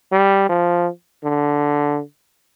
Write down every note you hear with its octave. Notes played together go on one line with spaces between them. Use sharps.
G3
F3
D3